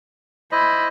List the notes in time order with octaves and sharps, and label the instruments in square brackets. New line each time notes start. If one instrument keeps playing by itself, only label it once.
[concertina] E4 C5 D#5 [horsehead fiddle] B5